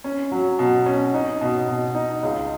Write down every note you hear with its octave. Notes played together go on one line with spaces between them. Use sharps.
C#4
F#3
B2
C#4
D#4
B2
B2
D#4
C#2